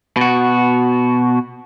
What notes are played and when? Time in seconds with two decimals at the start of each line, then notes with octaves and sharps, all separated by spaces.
0.17 B2 F#4